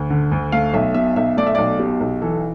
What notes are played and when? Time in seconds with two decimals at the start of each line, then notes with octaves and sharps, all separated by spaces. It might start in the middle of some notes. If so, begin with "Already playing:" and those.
Already playing: D2
0.10 D3
0.32 D2
0.52 A3 F5
0.74 B1 E5
0.94 B2 E5
1.16 B1 E5
1.37 A3 D5
1.47 E5
1.55 B1 D5
1.79 B2 G4
2.00 B1
2.22 E3 A4